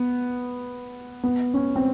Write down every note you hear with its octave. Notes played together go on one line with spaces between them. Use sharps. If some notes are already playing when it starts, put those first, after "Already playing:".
Already playing: B3
B3
C#4
C4